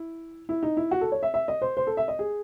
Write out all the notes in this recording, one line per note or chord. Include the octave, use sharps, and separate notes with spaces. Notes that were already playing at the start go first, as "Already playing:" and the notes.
Already playing: E4
E4
D#4
E4
F#4
A4
C#5
E5
E5
D#5
C5
C5
A4
E5
D#5
G#4